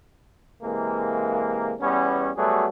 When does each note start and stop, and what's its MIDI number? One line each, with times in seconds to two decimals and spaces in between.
0.63 1.74 48
0.63 1.74 52
0.63 1.74 56
0.63 1.74 58
1.80 2.30 40
1.80 2.30 55
1.80 2.30 59
1.80 2.30 61
2.37 2.66 54
2.37 2.66 55
2.37 2.66 57
2.37 2.66 59
2.37 2.66 66
2.37 2.66 68